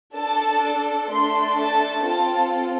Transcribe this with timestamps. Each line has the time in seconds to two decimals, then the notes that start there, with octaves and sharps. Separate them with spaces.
0.15 D4 A4 A5
1.10 A3 D4 A4 C6
1.58 A5
2.05 C4 F4 A4 A5